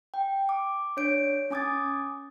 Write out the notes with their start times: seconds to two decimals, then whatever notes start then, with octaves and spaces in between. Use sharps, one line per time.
0.14 G5
0.49 D6
0.97 D4 C#5 G6 D7
1.50 C#4 G#5 D6 D#6 G#6 A6